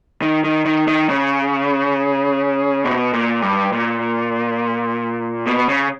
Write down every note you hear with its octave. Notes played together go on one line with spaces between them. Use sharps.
D#3
D#3
D#3
D#3
C#3
B2
A#2
G2
A#2
B2
C#3